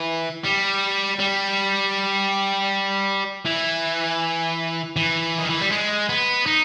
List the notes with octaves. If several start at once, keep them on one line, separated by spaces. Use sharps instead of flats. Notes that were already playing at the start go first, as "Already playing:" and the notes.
Already playing: E3
G3
G3
E3
E3
D#3
E3
G3
G#3
B3
D#4